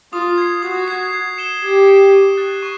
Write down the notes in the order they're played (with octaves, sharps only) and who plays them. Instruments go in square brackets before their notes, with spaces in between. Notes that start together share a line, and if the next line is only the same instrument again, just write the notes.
[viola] F4 [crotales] D#6
[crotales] G#6 C7
[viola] F#4 [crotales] D#6
[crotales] G#6 C7
G#6
C#7 E7 G7
[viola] G4 [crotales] G#6
[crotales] C#7 E7 G7
C#6
F#6 A6
C#6